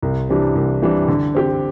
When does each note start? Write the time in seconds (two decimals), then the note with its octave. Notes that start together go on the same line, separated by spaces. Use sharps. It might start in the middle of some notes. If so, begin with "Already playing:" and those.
0.02 C2
0.29 C3 E3 G3 D4
0.55 C2
0.82 C3 E3 G3 D4
1.08 D3
1.35 C4 G4